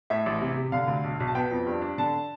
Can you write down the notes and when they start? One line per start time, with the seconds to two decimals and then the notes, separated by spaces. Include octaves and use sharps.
0.10 A2 E5
0.26 A1
0.41 C3
0.56 C3
0.72 D3 F5
0.88 D2
1.04 B1
1.20 B1
1.27 A5
1.35 B3 G5
1.51 F2
1.67 G2
1.81 D4
1.98 D3 A5